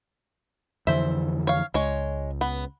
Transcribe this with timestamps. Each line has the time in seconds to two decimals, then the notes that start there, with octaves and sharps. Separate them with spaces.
0.87 F2 D3 E3 C5 E5
1.47 C#5 F5
1.74 C#2 G#3 C#5
2.41 B3